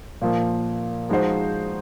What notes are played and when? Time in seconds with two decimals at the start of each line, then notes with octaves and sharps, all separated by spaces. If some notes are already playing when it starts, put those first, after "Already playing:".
0.21 A#2 F3 A#3
1.09 F3 G#3 D#4 F#4 C5